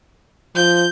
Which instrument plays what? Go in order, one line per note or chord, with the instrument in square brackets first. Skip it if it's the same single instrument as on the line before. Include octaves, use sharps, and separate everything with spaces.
[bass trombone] F3 [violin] G6